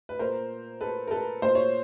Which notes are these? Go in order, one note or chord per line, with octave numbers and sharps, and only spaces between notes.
B4
A#2 A#4 C5
A4 B4
A#4
A4 B4
A#2 C5
C#5